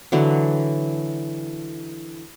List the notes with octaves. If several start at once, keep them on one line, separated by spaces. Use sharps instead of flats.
D3 E3 F#3